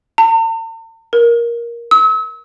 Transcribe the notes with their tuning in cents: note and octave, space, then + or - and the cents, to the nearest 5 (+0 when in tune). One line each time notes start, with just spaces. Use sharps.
A5 +45
A#4 +10
E6 -40